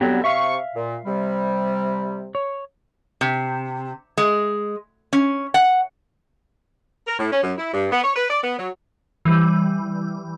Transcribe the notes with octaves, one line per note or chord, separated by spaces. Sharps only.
D3 F#3 G3 B3 C4 G4
C3 E5 F5 C#6
A#2
C3 G3
C#5
C3
G#3
C#4
F#5
A#4
A2
C#4
F#2
E4
G2
B3
C#5
B4
D5
B3
F#3
E3 G3